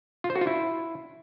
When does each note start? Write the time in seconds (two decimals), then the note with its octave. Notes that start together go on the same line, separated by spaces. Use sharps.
0.24 F4
0.30 C5
0.36 F#4
0.41 F4
0.47 E4